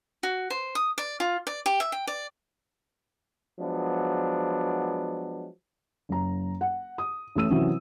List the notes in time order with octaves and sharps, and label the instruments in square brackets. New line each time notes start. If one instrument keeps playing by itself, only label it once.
[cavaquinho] F#4
C5
D#6
D5
F4
D5
G4
E5
G5
D5
[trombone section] F3 F#3 G#3 B3 D4
[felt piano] F#1 A#5
F#5
D#6
A1 A3 E6 D#7
C3 E3 F#3 C4 C#4